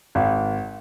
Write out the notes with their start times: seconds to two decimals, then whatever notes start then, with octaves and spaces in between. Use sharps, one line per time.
0.15 G#1